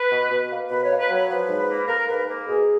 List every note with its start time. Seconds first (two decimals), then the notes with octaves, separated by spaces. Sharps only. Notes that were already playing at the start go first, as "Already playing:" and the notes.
Already playing: B4
0.10 B2
0.30 B2
0.50 A#3
0.69 B2 B4
0.84 C#5
0.90 A#3
0.99 B4
1.09 F#3 C#5
1.28 F3 B4
1.48 G#2
1.68 A#3
1.87 A#3 A#4
2.07 G#2 B4
2.28 A#3 A#4
2.47 B2 G#4